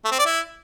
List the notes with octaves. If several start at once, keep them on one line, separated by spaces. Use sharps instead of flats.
A3
C4
D5
E4